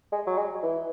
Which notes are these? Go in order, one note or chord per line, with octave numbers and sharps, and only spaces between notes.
G#3
F#3
G#3
E3